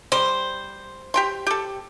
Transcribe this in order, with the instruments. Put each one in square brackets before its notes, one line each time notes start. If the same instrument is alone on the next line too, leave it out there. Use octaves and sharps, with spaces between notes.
[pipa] G3 [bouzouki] C5
[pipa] G4 G5 C6
G4 A4